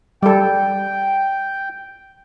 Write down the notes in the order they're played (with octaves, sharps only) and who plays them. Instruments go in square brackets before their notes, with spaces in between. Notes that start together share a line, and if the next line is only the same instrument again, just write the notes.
[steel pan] G3 A4 [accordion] G5